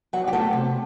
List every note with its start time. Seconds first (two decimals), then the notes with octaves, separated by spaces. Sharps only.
0.13 F#3 F#5
0.28 G4
0.33 A3 A4
0.53 C3